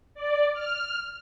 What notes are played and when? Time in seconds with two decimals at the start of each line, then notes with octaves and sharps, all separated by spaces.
0.15 D5
0.54 F6